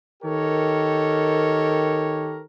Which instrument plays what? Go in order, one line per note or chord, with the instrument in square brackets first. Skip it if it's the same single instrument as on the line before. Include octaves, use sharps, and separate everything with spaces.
[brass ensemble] D#3 G4 A4 A#4 C#5